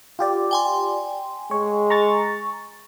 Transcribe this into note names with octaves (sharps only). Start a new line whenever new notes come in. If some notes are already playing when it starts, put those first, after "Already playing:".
F4 G4 D5
G5 G#5 C6
G#3 C#5
A#5 C#6 A6